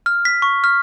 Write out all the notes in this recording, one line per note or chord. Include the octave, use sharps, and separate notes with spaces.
F6
B6
C#6
F6